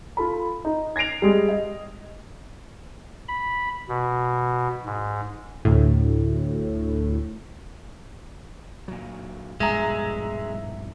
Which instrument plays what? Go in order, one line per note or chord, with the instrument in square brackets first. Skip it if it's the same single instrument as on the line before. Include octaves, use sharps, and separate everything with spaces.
[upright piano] F4 A4 B5
D#4
G#6 A#6 C7 D7 F7
G3 G#3 G#4
D#5
[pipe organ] B5
B2
G#2
[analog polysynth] D2 A2
[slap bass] A#2 F#3
[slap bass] A#1 G2 B2 [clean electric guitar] G#3 [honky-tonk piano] E5 A#5